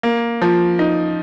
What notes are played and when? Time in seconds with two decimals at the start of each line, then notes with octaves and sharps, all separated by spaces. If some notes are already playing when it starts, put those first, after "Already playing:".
0.03 A#3
0.42 F3
0.79 D#4